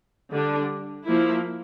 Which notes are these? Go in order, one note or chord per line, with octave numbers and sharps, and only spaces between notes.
D3 G3 D4
F3 A#3 E4